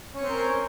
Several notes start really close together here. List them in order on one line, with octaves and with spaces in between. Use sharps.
C#4 C#5 C4 C5 A#4